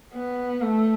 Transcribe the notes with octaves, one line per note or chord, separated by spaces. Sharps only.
B3
A3